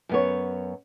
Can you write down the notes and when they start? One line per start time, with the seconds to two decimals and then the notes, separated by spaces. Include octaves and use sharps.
0.09 F#2 B3 C#5